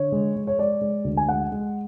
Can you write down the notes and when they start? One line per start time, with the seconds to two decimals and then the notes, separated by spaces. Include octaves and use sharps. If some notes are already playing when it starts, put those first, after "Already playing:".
Already playing: D3 C#5
0.12 G#3
0.36 G#3
0.47 C#5
0.59 G#3 D5
0.81 G#3
1.04 D2
1.17 G#5
1.28 G#3 F#5
1.52 G#3